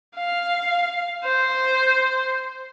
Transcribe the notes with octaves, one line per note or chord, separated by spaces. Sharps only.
F5
C5